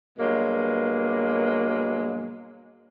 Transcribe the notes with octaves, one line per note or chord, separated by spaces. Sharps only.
G2 B2 F#3 G#3 A#3